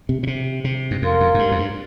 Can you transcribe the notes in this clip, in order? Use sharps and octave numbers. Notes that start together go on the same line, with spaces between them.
C3
A#2
C3
C3
G2
F2 A#4 F5 C6
F2
G#2
G2
F2
G2